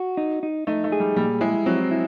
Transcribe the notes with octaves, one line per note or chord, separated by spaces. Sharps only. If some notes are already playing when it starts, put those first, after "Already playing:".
Already playing: F#4
D#4
D#4
A3 D#4
A3
G#4
G3
A#2 G3
G#3 E4
F#3 C4
E4